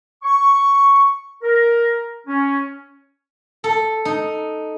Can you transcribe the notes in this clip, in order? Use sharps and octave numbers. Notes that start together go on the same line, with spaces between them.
C#6
A#4
C#4
A4
D#4